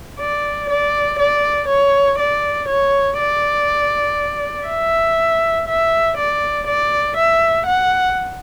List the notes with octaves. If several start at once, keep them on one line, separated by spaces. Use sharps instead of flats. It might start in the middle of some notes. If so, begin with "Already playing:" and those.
D5
D5
D5
C#5
D5
C#5
D5
E5
E5
D5
D5
E5
F#5